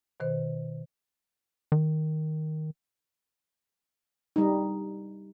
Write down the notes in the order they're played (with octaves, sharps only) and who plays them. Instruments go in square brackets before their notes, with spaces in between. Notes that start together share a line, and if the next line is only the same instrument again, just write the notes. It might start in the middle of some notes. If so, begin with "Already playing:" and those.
[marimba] B2 D#3 C5
[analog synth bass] D#3
[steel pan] G3 D#4